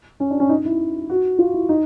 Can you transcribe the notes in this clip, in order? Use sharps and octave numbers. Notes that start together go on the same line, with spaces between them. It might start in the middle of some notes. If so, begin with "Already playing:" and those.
C#4
D4
C#4
D#4
E4
F#4
F4
E4
D#4